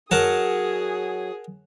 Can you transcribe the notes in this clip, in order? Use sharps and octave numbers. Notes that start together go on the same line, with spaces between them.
F#3 G#4 A#4 F#5 A5 D#6